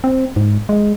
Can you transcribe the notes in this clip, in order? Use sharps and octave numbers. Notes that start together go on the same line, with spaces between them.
C4
G#2
G#3